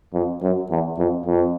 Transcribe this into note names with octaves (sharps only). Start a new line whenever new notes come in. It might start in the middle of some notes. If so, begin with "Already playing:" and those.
F2
F#2
E2
F2
F2